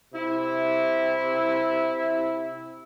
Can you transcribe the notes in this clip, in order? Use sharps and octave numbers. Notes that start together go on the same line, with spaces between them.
C3 E4